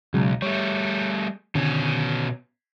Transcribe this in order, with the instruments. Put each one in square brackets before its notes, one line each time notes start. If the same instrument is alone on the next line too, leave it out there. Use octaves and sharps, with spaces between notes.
[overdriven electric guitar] B1 [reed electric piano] C#3 F#3 G#3
[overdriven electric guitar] G3 A3 [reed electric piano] C#5
[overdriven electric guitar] B2 C#4 [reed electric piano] D3 D#3